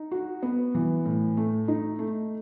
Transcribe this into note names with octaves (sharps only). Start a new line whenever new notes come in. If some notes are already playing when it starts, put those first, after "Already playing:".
Already playing: D#4
F#4
B3
E3
A2
A3
D#4
A3